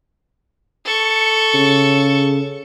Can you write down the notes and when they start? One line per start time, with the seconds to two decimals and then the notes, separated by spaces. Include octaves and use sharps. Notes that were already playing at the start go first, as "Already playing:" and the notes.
0.85 A4 C#6
1.54 C#3